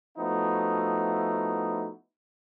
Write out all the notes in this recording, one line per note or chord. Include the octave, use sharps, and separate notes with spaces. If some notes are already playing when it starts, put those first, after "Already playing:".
F3 A3 B3 D#4 E4 F#4